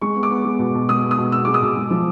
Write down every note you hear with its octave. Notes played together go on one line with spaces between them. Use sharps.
G#3 C#6
B3
D6
B3
G#3
B2
B2
G#3 D#6
B3
D#6
B2
B3 E6
G#3 D6
D#6
B2
G#3
F3